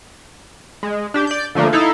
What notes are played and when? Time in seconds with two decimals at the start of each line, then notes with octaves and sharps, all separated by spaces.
0.83 G#3
1.14 D4 G4
1.27 D5 G6
1.55 D3 F3 A3 A#3 D4
1.72 D#4 E4 A4 F5